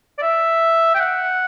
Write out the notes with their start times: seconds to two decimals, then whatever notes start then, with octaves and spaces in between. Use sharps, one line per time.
0.18 D5
0.22 E5
0.95 G5
1.00 F#5